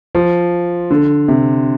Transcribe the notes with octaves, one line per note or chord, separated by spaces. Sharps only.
F3
D3
C3